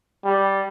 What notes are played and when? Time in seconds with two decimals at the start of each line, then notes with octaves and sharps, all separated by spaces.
0.25 G3